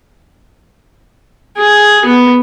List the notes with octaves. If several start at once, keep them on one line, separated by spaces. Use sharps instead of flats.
G#4
B3